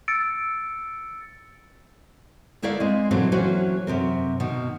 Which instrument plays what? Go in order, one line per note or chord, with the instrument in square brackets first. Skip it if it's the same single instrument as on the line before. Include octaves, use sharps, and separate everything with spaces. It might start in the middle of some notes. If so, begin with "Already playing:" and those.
[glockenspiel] E6 A6 C#7 D7
[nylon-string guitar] D2 A3 E4 A#4 D5 F5
G#3 C4
A#2 D3 E3 F#3 C4 E4
E3 F#3 A#3 C#4 F#4 C5
F#2 C3 C4 A#4
B2 D#3